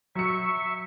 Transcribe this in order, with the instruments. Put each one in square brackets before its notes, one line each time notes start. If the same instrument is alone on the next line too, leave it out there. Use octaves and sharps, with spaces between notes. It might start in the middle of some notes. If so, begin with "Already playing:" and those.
[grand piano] F#3 C#7 [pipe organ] E5 C#6